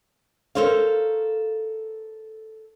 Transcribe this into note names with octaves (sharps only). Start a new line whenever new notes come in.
A4 A#4 C5 C#5 F5